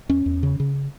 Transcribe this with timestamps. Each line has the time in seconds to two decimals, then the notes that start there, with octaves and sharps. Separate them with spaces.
0.09 E2 C#4
0.26 E2
0.43 C#3
0.60 C#3